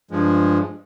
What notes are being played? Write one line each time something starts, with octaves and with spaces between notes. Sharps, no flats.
G2 F3 G#3